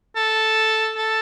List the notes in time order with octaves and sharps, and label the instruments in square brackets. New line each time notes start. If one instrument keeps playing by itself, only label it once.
[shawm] A4
A4